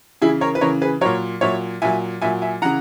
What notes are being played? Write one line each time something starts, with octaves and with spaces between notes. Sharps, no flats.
C#3 E3 E4 G#4
A#4 C#5
B4
C#3 E3 A#4 C#5
G#4 B4
A#2 F#3 A#4 C#5
A#2 F#3 C#5 E5
A#2 F#3 E5 G#5
A#2 F#3 E5 G#5
E5 G#5
C#3 E3 F#5 A#5